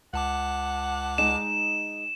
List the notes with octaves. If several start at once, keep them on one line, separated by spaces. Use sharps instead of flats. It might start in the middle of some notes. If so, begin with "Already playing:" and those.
C#2 F#5 A5 D6
G#3 D#4 E7